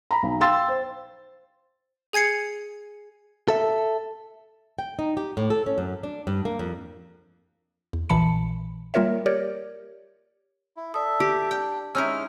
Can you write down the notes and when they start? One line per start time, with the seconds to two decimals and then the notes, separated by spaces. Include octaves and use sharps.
0.11 A#5 B5
0.23 B1
0.40 F5 G5 C6 E6 A6
0.68 C5
2.13 G#4 G#5 G#6 C7 C#7
3.48 A4 E5
4.79 G5
4.99 D#4
5.17 G4
5.37 A2
5.50 A4
5.66 C#4
5.78 F#2
6.03 D4
6.27 G2
6.45 A#3
6.59 F2
7.93 E2
8.09 A#1 A#2 E3 A5 B5 C#7
8.94 G3 A#3 F4 A#4 C#5 E5
9.26 G4 A#4 C#5 D5
10.77 E4
10.94 A4 D5 E5 D#6
11.20 G4
11.51 D4 G5
11.95 G#3 C#4 D#4 E4 E6 F6